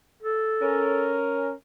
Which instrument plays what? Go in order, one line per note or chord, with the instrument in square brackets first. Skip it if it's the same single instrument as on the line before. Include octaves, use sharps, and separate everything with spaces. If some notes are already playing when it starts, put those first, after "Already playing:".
[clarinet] A4
[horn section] C#4 A#4